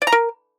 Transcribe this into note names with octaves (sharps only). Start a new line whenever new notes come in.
D5
A#5
A#4